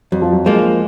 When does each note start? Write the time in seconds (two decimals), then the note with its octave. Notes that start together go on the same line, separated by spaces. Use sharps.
0.12 F2 F#3
0.22 F3
0.32 F#3
0.46 F3 G#3 A#3